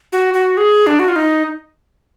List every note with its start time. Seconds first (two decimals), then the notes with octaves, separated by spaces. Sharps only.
0.12 F#4
0.34 F#4
0.57 G#4
0.87 D4
0.99 F#4
1.08 F4
1.16 D#4